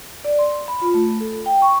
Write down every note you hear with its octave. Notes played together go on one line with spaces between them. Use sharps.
D5
C6
B5
F4
A3
A4
G5
C#6